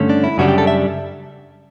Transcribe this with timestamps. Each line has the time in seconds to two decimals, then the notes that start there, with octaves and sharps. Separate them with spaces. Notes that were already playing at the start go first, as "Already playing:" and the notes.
Already playing: G2 D3 A3 C#4
0.09 D4
0.24 E4
0.38 F#2 C#3 G3 D4 F#4
0.48 G4
0.58 A4
0.67 E5